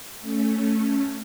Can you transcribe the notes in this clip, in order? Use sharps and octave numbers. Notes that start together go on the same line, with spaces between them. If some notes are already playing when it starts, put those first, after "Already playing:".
A3 C#4